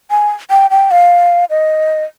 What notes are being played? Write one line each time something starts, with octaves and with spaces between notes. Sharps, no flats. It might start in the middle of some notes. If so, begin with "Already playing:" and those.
G#5
G5
G5
F5
D#5